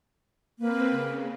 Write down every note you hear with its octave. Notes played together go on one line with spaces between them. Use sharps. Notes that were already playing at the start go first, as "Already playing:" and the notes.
A#3 C4 B4
C#3